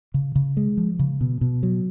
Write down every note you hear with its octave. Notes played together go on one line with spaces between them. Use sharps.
C#3
C#3
G#3
F3
C#3
B2
B2
F#3